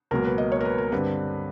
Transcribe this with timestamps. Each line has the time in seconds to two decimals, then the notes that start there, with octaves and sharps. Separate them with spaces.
0.11 C#2 B2 F#3 A#3 A#4
0.25 B4
0.38 D#5
0.52 C#5
0.61 A#4
0.65 B4
0.78 A#4
0.92 G2 D3 G3 C4 B4